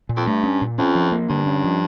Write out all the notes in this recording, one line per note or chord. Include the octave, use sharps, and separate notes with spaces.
A#2
F2
G2 A3
C#4
A#2
F2 C#4
F3
A#3
G2 D3
C#4
F3